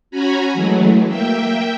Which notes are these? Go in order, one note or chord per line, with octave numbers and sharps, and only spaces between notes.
C#4 F#4 G#5 A#5 B5
E3 F#3 G#3 A3
A#3 E5 G5